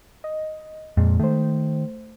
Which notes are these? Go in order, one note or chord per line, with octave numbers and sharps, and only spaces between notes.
D#5
F2 A#2 G#3
D#3 A3 C5